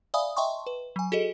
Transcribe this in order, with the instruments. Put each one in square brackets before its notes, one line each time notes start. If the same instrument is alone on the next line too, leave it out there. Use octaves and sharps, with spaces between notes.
[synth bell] D5 E5 F5 G#5 B5 D#6
D#5 E5 G5 A5 C6 C#6
B4
F#3 G#5
F#4 G#4 A4 D#5